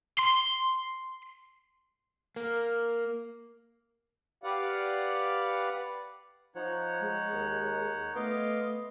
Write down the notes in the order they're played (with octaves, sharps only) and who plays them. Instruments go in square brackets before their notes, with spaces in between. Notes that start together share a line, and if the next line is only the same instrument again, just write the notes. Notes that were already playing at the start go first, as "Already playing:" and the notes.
[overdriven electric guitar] C6
A#3
[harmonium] G4 B4 D5 F5 F#5
[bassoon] F3 [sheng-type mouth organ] D#4 C#5 F#5
[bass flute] G#3
[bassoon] D#2
[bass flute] A3 [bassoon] B3 [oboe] D#5 [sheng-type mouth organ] F5 C6 D6